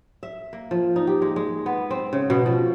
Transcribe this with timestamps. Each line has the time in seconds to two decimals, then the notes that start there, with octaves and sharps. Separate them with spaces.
0.23 E5
0.53 A#3
0.71 F3
0.96 D#4
1.07 G4
1.22 G#3
1.36 G#3
1.66 B3
1.91 C4
2.13 C#3
2.30 B2
2.46 F3